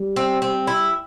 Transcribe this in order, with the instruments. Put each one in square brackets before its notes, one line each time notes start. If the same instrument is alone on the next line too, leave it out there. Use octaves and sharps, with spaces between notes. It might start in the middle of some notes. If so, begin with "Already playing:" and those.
Already playing: [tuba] G3
[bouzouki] C4
C4
E4